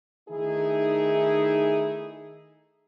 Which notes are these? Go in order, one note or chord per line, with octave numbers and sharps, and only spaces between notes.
D#3 A3 D#4 E4 G#4